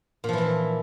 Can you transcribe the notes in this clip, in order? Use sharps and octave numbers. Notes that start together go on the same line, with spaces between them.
A#2 E3 F3 E4